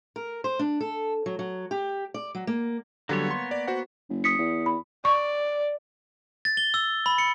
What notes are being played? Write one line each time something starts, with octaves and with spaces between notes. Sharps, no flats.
A#4
C5
D4
A4
F#3
F#3
G4
D5
F#3
A#3
D3 F#3 G3 A#3 B3 C#5
C6
D5
F#4 C5 F#5
F#1
D#6 B6 C#7
E2
B5
D5 C#6
A6
G7
E6
B5
C#7